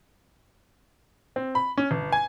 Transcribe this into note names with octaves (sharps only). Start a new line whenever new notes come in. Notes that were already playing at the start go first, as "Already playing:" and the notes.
C4
B5
C#4
G1
G#5